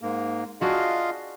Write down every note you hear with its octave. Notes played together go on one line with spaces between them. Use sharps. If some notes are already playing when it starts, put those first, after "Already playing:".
G#2 A#3
D4 F4 F#4 G#4 D#5 F5